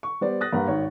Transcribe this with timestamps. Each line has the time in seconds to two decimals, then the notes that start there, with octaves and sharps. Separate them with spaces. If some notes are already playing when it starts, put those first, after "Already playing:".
0.03 C#6
0.21 G3 B3 C5 D5
0.41 D#6 F#6 A6 A#6
0.53 G2 A#3 B4 F#5 A#5
0.68 G#1 D#3 C#5